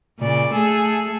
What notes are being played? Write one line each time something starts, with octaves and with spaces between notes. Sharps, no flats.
A#2 C#3 D5
A3 G#4 A4